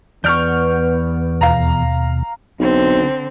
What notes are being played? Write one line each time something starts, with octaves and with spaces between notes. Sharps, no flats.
E2 B3 D5 C#6 F6 G6
D#2 B2 F5 A#5
B1 D3 C4